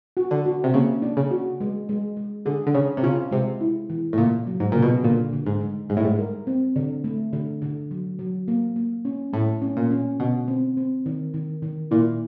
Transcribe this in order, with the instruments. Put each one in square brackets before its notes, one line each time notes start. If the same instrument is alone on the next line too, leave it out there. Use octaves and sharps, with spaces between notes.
[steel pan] F#4
[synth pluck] D3
[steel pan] F#4
[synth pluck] C3
[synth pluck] C#3 [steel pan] A#3
[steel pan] D4
[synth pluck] C#3
[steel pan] F#4
G#3
G#3
G#3
[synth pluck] D3 [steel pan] G#4
[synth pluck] D3
[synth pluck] C#3 [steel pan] C#5
[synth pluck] C3
[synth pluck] C#3 [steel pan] F4
[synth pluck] C3 [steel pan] G#3
[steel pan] E4
E3
[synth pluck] A2
[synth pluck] A#2 [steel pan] C#3
[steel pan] F#3
[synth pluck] G#2
[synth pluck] A#2 [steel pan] C#3
[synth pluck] B2
[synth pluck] A#2 [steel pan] D3
[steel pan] D3
[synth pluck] G#2
[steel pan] G#3
[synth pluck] G#2 [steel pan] G3
[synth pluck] A2
G#2
[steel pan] A#4
C4
D3
A3
D3
D3
F#3
F#3
A#3
A#3
C#4
[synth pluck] A2 [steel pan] A3
[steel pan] C#4
[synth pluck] A#2
[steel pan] C#4
[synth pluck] B2 [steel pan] D3
[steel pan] C4
C4
D#3
D#3
D#3
[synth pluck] A#2 [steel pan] E4